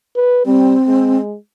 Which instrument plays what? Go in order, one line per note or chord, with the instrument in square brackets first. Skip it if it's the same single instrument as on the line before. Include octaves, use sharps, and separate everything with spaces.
[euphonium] B4
[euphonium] G3 [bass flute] C4
[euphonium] G#3